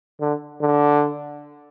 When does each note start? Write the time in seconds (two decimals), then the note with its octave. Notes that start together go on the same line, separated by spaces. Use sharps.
0.21 D3
0.61 D3